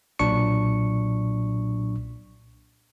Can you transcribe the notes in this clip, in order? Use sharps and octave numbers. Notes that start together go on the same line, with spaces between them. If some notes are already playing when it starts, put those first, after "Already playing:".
B1 A#2 F#3 D4 C#6 C#7